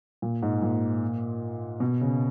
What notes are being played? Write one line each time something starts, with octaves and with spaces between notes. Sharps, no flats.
A#2
G#2
A#2
B2
C#3